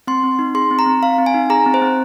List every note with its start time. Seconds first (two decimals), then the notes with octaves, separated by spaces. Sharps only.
0.07 C4 C6
0.23 C4
0.39 D#4
0.55 G#4 C6
0.71 C4
0.79 A#5
0.86 C4
1.02 C4 F5
1.18 C4
1.26 G#5
1.34 D#4
1.50 G#4 A#5
1.66 C4
1.74 C5
1.82 C4